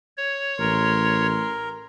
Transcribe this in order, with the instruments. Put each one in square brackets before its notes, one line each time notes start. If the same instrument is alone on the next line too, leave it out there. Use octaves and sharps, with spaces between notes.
[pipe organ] C#5
[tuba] A1 [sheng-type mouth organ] A#4 [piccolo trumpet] C6